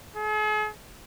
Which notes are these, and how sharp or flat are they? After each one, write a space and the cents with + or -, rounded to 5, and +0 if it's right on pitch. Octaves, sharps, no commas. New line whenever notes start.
G#4 +45